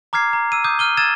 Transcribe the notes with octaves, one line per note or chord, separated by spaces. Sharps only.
A#5 D6 F6 G#6 C7
A#5
E6 D#7
D6 D#6 G6
F6 D#7 G7
E6 G#6 A6 D#7 E7